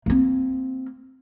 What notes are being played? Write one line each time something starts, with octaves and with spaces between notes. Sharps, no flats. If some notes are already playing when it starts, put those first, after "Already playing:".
A#3 C4